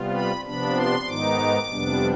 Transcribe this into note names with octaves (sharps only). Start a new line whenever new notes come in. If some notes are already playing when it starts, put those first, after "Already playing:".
Already playing: C3 G3 B3 F4
B5
C3 F3 B3 D4 B5
C6
G#2 D#3 B3 D#4 D6
F2 C3 G3 B3 D4